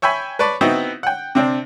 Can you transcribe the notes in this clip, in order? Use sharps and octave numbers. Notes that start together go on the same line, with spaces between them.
C#5 E5 G5 G#5 B5
B4 C#5 D5 A5 B5
B3 C4 D#4 E4 F#4
F#5 G5
C3 C4 D4